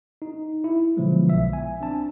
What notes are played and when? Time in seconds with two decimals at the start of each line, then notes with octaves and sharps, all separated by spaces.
0.22 D#4
0.64 E4
0.97 B2 D3 F3 F#3 G#3 B3
1.29 B1 E5
1.53 G#5
1.81 C4 D4 A5